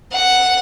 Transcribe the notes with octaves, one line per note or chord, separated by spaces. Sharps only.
F#5